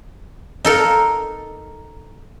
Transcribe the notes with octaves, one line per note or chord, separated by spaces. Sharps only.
D#4 A4 A#4